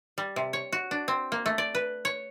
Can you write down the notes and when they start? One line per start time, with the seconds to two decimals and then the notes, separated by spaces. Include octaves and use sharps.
0.18 G3
0.36 C3
0.53 C#5
0.72 F#4
0.91 D4
1.08 C4
1.32 A#3
1.46 A3
1.58 D5
1.75 B4
2.05 C#5